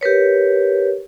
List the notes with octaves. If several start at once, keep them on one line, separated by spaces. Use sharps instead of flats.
G4 A#4 B4 C#5